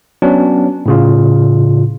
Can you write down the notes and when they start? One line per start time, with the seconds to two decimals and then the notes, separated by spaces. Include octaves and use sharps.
0.22 F#3 B3 C#4 D4
0.86 A2 C#3 F4